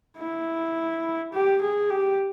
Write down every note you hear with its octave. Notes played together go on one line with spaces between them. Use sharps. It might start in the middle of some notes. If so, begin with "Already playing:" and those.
E4
G4
G#4
G4